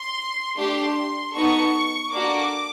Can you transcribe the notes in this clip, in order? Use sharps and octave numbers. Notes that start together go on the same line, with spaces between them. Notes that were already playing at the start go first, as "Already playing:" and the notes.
Already playing: C6
A3 D4 G4 C6
B3 D#4 F#4 A4 C#6
A#3 D4 F#4 A4 D6